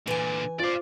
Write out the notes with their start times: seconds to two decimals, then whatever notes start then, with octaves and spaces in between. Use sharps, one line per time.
0.07 A#2 D3 E3 G#5
0.59 F4 C5 D5 F5 D6